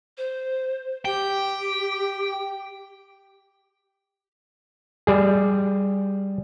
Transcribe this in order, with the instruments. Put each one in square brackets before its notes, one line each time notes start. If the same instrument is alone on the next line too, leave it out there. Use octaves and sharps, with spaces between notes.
[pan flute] C5
[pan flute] G4 [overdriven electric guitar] G5
[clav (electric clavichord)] G3 G#4